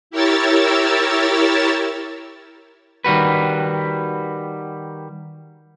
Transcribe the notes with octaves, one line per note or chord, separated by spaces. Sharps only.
E4 G4 A#4 C#5 E6 A6
D#3 G3 F#4 B4